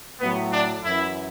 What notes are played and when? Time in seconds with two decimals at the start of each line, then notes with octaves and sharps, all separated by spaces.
0.21 A2 F#3 B3
0.52 D4
0.83 F#2 E3 E4